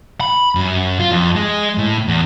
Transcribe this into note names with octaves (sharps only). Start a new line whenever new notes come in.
B5
F#2
F4
F2
G#3
A2
E2